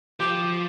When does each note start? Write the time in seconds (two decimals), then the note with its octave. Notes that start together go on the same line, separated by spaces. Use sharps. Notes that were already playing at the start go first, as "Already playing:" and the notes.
0.20 F3 G4